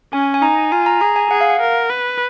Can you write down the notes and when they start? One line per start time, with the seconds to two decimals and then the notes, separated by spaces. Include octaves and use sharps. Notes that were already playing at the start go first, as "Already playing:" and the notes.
0.13 C#4 G#5
0.34 G#5
0.42 D#4 A#5
0.72 F4 G#5
0.86 A#5
1.01 G#4 A#5
1.16 G#5
1.30 G#4 F#5
1.41 F5
1.50 F#5
1.60 A#4
1.89 B4